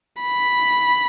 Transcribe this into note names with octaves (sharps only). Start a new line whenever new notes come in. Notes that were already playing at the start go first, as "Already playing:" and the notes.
B5